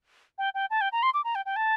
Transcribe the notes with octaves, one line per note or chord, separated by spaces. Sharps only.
G5
G5
A5
G5
A#5
C6
D6
A#5
G5
G5
A5